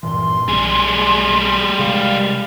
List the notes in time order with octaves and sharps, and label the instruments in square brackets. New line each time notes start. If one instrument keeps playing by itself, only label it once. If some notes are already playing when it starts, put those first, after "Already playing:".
[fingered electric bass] G2 A#2 E3 [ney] C6
[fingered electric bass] B1 [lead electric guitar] G3 G#4
[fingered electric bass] C3 G#3 [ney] F5